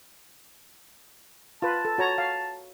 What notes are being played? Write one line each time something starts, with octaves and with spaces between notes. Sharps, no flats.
F4 B4 A5
A4
F#4 C#5 A#5
F5